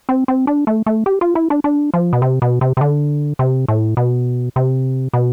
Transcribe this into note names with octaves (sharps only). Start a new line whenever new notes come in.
C4
C4
D4
A3
A3
G4
F4
E4
D4
D4
F3
B2
C3
B2
C3
C3
D3
C3
A2
B2
C3
B2